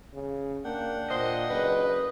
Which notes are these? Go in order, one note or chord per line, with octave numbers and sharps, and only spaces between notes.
C#3
A#3 D4 F#5 G5
A#2 C5 D#5
F#1 B4